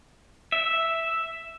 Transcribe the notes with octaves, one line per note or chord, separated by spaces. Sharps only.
E5